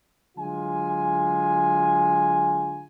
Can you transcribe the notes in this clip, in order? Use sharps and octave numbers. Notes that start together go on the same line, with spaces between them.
D3 F#3 G#3 F4 G#5